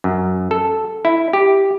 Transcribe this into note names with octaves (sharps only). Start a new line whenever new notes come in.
F#2
A4
E4
G4